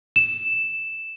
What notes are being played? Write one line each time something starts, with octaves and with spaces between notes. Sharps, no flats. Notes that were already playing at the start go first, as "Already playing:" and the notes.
E7